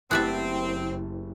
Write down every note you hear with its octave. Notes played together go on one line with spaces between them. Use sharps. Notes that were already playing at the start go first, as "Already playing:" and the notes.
F#1 A3 B3 C4 E4 G4 D5 E5